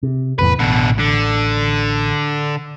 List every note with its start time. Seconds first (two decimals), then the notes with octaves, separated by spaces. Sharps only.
0.03 C3
0.39 F1 E2 A2 B4
0.59 A1 B2 D3
0.99 D3